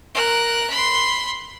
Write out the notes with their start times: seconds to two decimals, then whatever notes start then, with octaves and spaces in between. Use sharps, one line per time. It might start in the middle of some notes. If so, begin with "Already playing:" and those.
0.14 A#4 F#6
0.70 B5 C6